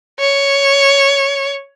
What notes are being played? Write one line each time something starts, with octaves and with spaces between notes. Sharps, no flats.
C#5